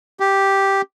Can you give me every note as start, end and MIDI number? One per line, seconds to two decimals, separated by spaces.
0.20 0.82 67